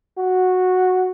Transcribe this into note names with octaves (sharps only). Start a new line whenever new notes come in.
F#4